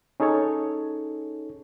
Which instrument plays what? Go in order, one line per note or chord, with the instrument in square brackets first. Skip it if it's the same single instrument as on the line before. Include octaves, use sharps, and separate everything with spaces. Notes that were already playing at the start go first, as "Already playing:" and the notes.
[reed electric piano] C#4 D#4 G#4 A4 C#5